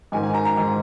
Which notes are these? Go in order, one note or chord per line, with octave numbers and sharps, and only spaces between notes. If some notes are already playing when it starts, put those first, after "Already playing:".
G#2 D#3 G#5
G#5
A#5
A#5
G#2 D#3